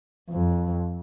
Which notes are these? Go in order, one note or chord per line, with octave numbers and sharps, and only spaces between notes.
F2